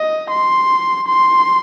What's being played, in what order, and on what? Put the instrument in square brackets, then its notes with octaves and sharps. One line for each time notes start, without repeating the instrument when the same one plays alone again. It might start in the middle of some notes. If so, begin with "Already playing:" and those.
Already playing: [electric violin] D#5
C6
C6